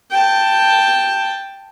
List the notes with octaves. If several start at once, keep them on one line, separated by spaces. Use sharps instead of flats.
G5 A5